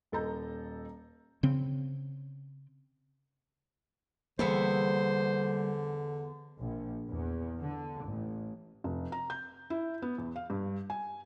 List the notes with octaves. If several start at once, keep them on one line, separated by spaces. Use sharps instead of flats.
D#1 A4 D#5 A#5 G6
C#3 C4
E2 D3 G3 A#3 B3 C5 E5
A#1
E2
D3
A1
F1
A#5
G6
E4
B3
E2
F5
G2
G#5